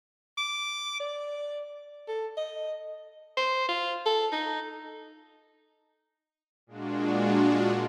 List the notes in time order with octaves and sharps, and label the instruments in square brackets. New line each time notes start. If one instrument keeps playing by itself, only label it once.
[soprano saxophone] D6
D5
A4
D#5
C5
F4
A4
D#4
[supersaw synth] A#2 G#3 D4 F4 F#4